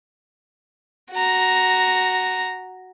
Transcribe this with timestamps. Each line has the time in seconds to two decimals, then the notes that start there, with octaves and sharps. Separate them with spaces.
1.11 F#4 A#5